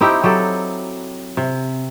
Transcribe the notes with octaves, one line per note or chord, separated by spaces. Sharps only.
C4 D#4 E4 G4
F#3 G4 A4
C3